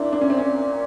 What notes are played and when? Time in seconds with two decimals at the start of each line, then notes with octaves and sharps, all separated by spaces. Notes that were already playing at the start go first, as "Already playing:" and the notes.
Already playing: A#2 D4 E4
0.13 D4
0.21 C#4
0.30 C4
0.38 C#4